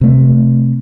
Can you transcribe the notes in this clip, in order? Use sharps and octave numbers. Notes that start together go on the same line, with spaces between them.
C3 A3